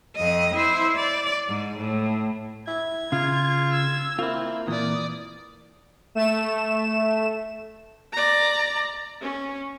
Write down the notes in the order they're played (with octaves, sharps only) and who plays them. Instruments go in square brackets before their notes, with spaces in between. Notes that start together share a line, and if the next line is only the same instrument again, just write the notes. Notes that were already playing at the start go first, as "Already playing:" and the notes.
[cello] F2 D#5
E4 C5
D5
G#2
A2
[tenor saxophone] E4 [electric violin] G#6
[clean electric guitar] C#3 [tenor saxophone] F4
[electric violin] E6 G#6
[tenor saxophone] A#3 [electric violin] C4 [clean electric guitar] E4 F4
[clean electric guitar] A#2 E3 [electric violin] D5 D#6
[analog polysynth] A3 E7
[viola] D5 A#5
C#4